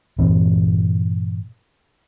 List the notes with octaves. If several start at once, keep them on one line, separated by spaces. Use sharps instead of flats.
G2 A#2 E3 C4